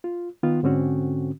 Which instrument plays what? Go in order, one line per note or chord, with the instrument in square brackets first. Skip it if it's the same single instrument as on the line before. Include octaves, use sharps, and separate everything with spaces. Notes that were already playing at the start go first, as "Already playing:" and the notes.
[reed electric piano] F4
D#3 B3 F4
G#2 D3 C4 C#4 F#4